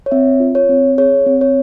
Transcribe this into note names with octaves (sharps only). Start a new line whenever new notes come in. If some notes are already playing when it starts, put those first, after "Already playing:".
C#5
C4 E5
F4
C#5
C4
G#4 C#5
C4
C#5